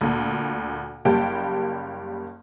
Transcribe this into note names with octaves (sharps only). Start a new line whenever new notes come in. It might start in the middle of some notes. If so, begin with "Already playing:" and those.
D2 A#2
F#1 G3 A#3 G5 A5